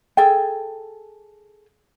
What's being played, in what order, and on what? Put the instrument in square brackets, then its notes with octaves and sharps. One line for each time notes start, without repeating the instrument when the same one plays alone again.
[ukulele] G#4 A4 G5